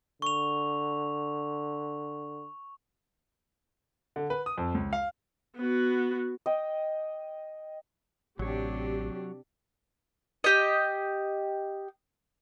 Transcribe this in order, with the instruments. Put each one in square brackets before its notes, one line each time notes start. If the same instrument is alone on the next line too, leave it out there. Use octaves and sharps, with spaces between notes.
[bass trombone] D3 [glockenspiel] C#6 F7
[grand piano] D3
B4
D#6
F2
C#2
F5
[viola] B3 F#4
[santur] D#5 G5
[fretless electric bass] A1 [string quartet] C3 D4 [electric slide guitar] F#3 C#5 [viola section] G4
[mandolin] G4 D#5